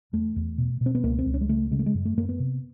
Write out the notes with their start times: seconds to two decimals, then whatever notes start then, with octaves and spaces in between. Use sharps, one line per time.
0.13 E2 A3
0.36 E2
0.58 B2
0.81 B2
0.86 C4
0.95 B3
1.03 C#2 A#3
1.19 C4
1.26 C#2
1.34 C#4
1.41 G#3
1.49 C#3 A3
1.71 C#3 G#3
1.79 A3
1.86 G#3
1.95 F#2
2.05 A3
2.17 F#2 A#3
2.29 B3
2.39 C3